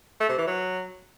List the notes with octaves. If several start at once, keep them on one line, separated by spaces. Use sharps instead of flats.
A3
C3
E3
F#3